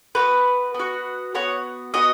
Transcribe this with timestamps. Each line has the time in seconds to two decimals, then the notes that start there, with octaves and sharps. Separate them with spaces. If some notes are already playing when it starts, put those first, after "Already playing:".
0.15 B3 F#4 B4
0.74 B3
0.79 F#4
1.34 B3 F#4 C#5
1.94 B3 F#4 D#5